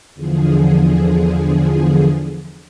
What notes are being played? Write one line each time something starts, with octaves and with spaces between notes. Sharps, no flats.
E2 D3 F3 G#4